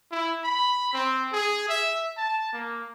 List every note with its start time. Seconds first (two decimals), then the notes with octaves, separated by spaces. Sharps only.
0.12 E4
0.44 B5
0.94 C4
1.33 G#4
1.69 E5
2.17 A5
2.53 A#3